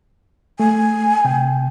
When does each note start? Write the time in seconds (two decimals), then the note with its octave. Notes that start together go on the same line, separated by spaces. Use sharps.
0.60 A3 G#5
1.25 C3 G5